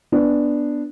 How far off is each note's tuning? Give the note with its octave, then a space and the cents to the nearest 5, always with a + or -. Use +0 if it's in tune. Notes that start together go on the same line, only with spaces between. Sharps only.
B3 +0 D4 +0